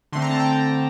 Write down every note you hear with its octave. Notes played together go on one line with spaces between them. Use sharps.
D3 A3 C4 C6
A#5
A5
G5 A#5